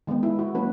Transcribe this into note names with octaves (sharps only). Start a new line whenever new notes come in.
D#3 G#3 B3
E4
F#4
F#3 A#3 C#4 B4